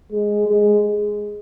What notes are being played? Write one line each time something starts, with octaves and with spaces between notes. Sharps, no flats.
G#3
G#3